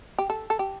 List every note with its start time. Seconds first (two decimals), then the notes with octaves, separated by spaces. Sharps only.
0.18 G4
0.30 A4
0.50 A4
0.59 G4